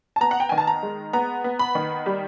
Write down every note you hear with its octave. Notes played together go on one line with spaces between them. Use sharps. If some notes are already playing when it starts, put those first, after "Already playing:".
A5
B3 A#5
F#5
G5
D#3 G#5
A5
A#5
G#3
B3 A#5
B3
B5
D#3
G3